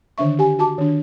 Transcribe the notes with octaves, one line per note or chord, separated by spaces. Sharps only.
D3 D#3 D4 E5 C#6
G4 G#5
F#4 A5 D6
D#3 D4